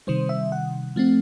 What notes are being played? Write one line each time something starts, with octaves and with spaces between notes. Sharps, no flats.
C3 D#3 G3 C5
E5
F#5
F3 A3 C4